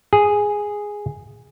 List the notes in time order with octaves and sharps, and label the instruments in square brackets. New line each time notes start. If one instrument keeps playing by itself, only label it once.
[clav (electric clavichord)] G#4